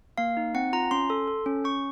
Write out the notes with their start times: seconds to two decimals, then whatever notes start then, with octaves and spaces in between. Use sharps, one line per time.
0.18 A#3 F5
0.37 D#4
0.54 C4 F#5
0.73 F4 A#5
0.91 C#4 C6
1.10 A4
1.28 A4
1.46 C#4
1.64 C#4 C#6